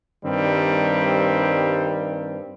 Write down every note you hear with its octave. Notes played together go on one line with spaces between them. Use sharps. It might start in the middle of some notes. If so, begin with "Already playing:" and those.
G2 D#3 G3 C4